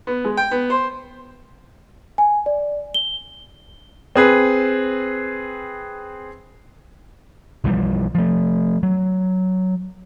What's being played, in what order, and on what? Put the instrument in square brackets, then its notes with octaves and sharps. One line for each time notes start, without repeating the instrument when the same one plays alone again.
[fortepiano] B3
G#3
G5
B3
C5
[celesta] G#5
D5
G7
[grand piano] C4 G#4 B4
[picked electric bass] B1 E3 F3 G3
F3 A3
F#3